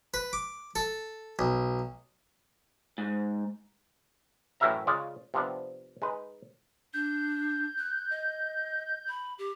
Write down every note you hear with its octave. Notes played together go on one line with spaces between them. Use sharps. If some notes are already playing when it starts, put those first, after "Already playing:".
B4
D6
A4
B1
G#2
F#2 A2 E3 A#4 E5 A#5
C#3 G#3 F4 D5
C3 F3 B3 D4
G#3 D#4 B4
D4 G6
F#6
D#5
B5
G4